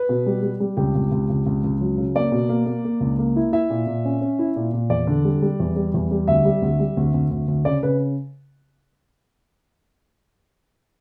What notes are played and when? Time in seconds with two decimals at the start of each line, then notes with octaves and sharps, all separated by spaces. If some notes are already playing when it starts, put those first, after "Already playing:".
Already playing: B4
0.09 B2
0.26 G3
0.43 G3
0.60 G3
0.77 C#2 G4
0.95 C#2
1.11 C#2
1.30 C#2
1.46 C#2
1.64 C#2
1.81 F#3
1.98 C#3
2.15 A#3 D5
2.32 B2
2.49 A#3
2.66 A#3
2.84 A#3
3.00 C#2
3.19 A#3
3.36 E4
3.53 E4 E5
3.70 A#2
3.87 A#2
4.05 C#4
4.21 C#4
4.39 E4
4.56 A#2
4.73 A#2
4.90 E2 D5
5.07 D3
5.25 G3
5.42 G3
5.60 E2
5.76 G3
5.94 E2
6.11 G3
6.28 D2 E5
6.45 G3
6.62 D2
6.80 G3
6.97 D2
7.14 D2
7.31 D2
7.48 D2
7.65 C#3 D5
7.83 C#3 B4